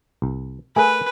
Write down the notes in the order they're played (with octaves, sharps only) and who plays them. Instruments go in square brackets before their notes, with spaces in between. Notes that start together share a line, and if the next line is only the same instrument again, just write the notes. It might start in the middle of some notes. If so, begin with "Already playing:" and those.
[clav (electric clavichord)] C2
[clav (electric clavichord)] A3 G#4 [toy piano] A#4 G#5 [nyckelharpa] B4